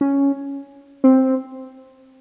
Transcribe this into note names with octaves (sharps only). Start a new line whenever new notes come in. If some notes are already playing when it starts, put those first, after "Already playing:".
C#4
C4